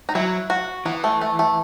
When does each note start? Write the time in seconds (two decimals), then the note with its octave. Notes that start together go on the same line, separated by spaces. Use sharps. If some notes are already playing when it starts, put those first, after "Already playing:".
0.09 D#4
0.15 F#3 E4
0.50 F#4
0.85 E3 B3
1.04 A3
1.21 A3
1.39 A3